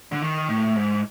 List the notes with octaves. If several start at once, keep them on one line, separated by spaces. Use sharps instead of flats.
D3
D#3
A2
G#2